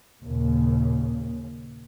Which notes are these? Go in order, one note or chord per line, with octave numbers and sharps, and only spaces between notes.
D#2 A#2 C#3